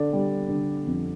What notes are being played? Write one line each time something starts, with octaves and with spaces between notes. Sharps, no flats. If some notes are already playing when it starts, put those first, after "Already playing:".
Already playing: D3 D5
G3
D3
F2